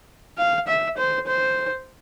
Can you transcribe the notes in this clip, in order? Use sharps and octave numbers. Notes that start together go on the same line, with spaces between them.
F5
E5
C5
C5